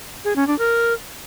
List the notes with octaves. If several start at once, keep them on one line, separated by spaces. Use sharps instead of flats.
G#4
C#4
D4
A#4